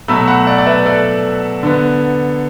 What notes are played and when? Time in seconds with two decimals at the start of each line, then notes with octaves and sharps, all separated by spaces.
0.08 B2 F#3 A3 B5 E6
0.27 F#5 B5
0.47 D5 F#5
0.58 D5
0.66 B4 E5
0.86 A4 D5
1.63 D3 B3